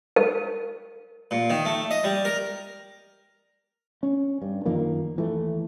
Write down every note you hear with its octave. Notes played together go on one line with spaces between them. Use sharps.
A#4
A#2
D#3
A3
D#5
G3
A#4
C#4
G2
F#2 D#3 F3 A#3
D#2 E3 A3